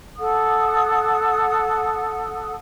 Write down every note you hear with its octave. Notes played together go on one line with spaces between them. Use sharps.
A4 F#5 D#6